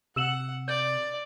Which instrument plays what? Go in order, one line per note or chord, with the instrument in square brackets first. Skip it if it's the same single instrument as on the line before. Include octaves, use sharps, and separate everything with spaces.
[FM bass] C3 [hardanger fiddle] F#5 [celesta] E6 E7 F#7
[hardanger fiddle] D5 [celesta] G6